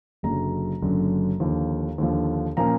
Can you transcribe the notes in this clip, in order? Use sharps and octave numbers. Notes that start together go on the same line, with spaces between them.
F#1 F#2 D3 F#3 A#5
F#1 F#2 D3 F#3
D#2 D3 F3
D#2 D3 F3
A#2 F3 A#3 C#4 A#5